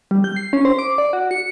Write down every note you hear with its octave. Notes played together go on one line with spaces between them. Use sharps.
G3
G6
C7
C#4
C5
D6
D5
F#4
C#7